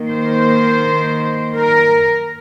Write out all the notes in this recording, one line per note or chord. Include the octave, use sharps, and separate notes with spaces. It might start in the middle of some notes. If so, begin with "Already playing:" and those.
Already playing: D#3 A#3
C5
A#4